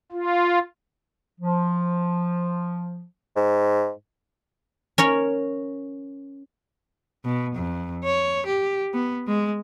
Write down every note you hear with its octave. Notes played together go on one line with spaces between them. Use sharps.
F4
F3
G#2
C#4 A#4 C#5
B2
F2
C#5
G4
B3
G#3